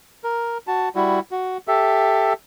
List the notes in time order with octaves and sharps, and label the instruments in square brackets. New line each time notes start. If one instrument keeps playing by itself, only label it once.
[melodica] A#4
F#4 A5
G3 E4 F#4
F#4
G4 A4 E5